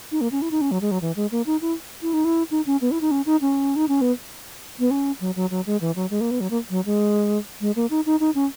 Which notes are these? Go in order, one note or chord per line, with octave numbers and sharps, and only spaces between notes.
D#4
A#3
C#4
E4
D#4
C#4
F#3
G#3
F#3
E3
G#3
A#3
D#4
E4
E4
D#4
E4
D#4
C#4
B3
E4
D#4
C#4
D#4
C#4
D#4
C#4
B3
B3
C#4
F#3
F#3
F#3
G#3
E3
F#3
G#3
A#3
B3
F#3
A#3
F#3
G#3
G#3
A#3
D#4
D#4
D#4
C#4